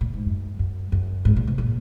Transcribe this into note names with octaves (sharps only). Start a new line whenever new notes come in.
A#2
G#2
F#2
F#2
F#2
G#2
A#2
B2
A#2